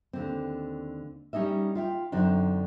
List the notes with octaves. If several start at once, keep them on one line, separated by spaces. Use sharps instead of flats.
D#2 D3 C4
G3 C#4 D#4 D#5 E5
F4 E5 G5
F#2 D3 C4 D4 D#4